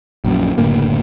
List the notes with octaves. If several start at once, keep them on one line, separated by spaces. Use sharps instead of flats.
A#1 F#2
F#1 A2 D3 A#3